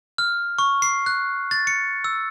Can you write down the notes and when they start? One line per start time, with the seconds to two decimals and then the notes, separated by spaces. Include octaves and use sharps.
0.18 F6
0.58 C#6
0.82 C7
1.06 F#6
1.51 A6
1.67 C#7
2.04 E6